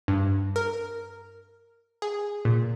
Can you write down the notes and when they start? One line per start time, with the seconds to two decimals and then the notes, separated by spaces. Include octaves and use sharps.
0.08 G2
0.56 A#4
2.02 G#4
2.45 A#2